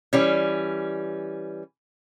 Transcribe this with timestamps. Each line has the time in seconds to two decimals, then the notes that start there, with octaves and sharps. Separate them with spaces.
0.13 E3 G3 C#4